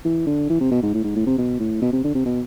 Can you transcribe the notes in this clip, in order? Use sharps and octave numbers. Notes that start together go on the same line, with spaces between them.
E3
D3
E3
C3
B2
G#2
A2
G#2
A2
C3
B2
A2
B2
C3
D3
C3
B2